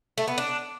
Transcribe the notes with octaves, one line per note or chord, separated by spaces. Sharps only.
A3
B3
D4